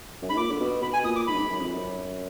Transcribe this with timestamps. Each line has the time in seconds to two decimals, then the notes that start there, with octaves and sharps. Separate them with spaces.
0.22 F#2
0.29 G#2 B5
0.36 A#2 D6
0.49 D3
0.60 B2
0.82 B2 B5
0.93 G#5
1.04 A#2 D#6
1.16 D6
1.27 G#2 B5
1.34 F#2
1.39 G#2
1.49 F#2
1.61 F2
1.72 F#2